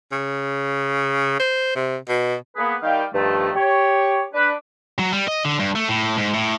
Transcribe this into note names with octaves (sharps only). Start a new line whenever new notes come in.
C#3
C5
C3
B2
A#3 B3 G#4 B4
D#3 G3 F5 G5
G2 D#3 F3 A3
G4 C#5
D4 B4
F#3
G3
D#5
D3
G2
A3
A2
G#2
A2